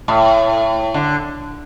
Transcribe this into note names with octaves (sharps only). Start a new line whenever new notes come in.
A2
D3